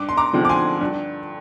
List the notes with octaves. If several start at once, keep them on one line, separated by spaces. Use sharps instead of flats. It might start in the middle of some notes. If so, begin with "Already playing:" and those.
Already playing: G2 D6
C6
A#5 D6
D3 F3 G#3 C4
D6
G#5 C6
G2